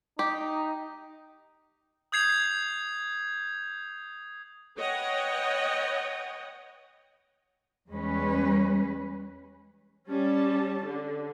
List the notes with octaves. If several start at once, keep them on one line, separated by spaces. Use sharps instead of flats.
D#4 G4
D#6 G6 G#6 C7 F7
B4 C#5 D#5 F#5 G5
E2 G3 G#3 C#4 B4
G3 C#4 A5
D3